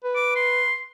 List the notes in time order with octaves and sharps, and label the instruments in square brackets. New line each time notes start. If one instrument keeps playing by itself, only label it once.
[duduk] B4
[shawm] D6
C6